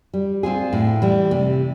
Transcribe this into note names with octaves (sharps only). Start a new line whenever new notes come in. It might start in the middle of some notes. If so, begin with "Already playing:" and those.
G3
C4 F4 G#4
A2
E3 G3
C3